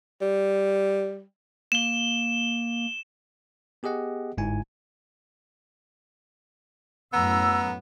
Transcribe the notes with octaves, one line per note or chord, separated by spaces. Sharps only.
G3
A#3 E7 G7
B3 G4 G#4 D#5 F#5
G1 G#2 E4 G#5
F#2 A2 B3 A#5 E6